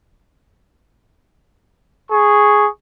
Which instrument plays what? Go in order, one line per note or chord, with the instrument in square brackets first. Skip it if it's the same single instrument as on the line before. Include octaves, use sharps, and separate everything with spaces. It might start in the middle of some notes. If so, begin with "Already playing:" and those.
[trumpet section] G#4 C#6